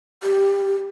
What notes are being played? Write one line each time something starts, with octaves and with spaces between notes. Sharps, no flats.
G4